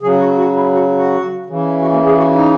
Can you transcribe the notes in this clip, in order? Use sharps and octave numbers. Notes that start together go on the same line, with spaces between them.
C#3 F#3 G#4
F#4
F#4
E4
F#4
F#4
C#3 E3
F#4
A#3
G#4
F#4
D#4